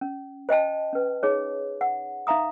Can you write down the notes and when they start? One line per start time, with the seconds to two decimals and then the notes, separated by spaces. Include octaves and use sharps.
0.01 C#4
0.49 C5 D#5 G5 A5
0.93 C#4 B4
1.23 D#4 G#4 C#5
1.81 F#5
2.27 D#4 E5 F5 A#5 D#6